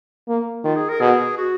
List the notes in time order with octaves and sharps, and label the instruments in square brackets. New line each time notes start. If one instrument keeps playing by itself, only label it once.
[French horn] A#3
[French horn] D#3 [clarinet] F4
[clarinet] G#4
A#4
[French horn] B2 [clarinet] G#4
[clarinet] F#4